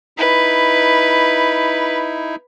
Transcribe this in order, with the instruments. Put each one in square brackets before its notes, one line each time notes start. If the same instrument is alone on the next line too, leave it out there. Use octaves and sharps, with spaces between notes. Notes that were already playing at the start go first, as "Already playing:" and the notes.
[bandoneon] D#4 E4 [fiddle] B4